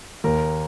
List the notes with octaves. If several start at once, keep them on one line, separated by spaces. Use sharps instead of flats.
D#2 A#4